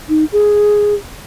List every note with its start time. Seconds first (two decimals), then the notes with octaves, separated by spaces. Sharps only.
0.08 D#4
0.32 G#4